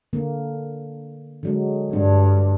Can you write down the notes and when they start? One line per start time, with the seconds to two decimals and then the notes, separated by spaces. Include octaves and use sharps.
0.13 D3 A#3
1.43 D3 F#3 G#3
1.93 G2 D4